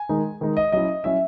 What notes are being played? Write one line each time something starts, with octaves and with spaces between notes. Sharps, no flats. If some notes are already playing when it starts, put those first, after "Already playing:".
Already playing: G#5
D#3 G#3 D#4
D#3 G#3 D#4
D#5
F#3 C#4 E4 D#5
F#3 C#4 E4 E5